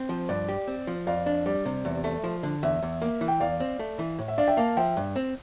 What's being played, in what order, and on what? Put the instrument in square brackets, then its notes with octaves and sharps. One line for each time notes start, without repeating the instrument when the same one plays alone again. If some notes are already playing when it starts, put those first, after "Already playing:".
Already playing: [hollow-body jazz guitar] C4
F3
[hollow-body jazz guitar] G2 [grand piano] D5
[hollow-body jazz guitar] G4
C4
F3
[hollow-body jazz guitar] F2 [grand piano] D5 F5
[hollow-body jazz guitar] D4
[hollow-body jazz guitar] G3 [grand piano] D5
[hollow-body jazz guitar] C3
E2
A3
F3
D3
[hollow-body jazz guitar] E2 [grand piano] E5
[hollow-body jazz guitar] E2
A#3
E3
[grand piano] G5
[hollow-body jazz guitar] E2 [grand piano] D5 F5
[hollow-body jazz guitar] C4
A3
E3
A2
[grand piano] E5
[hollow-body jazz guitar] D4 [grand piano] D5 F5
[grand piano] E5 G5
[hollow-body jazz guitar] A#3 [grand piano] F5 A5
[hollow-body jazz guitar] F3 [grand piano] E5 G5
[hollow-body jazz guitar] G2
C4